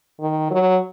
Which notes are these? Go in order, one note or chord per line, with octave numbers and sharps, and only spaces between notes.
D#3
F#3